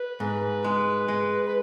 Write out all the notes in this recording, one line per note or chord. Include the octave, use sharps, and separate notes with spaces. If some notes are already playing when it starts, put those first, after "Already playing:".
Already playing: B4
G#2
G#3
G#3
B4